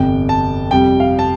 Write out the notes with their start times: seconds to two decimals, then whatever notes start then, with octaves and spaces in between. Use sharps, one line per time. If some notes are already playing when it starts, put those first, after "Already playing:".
Already playing: G1 F2 C3 G5
0.29 A5
0.71 F2 C3 G3 G5
1.00 F5
1.19 A5